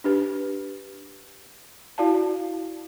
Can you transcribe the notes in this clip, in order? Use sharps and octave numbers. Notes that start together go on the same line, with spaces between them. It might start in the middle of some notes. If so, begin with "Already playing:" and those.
D4 G4 B4
E4 F#4 D5 F5 A5